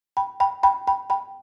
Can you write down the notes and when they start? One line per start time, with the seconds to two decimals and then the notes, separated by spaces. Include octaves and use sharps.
0.17 G5 B5
0.40 G5 B5
0.63 G5 B5
0.87 G5 B5
1.10 G5 B5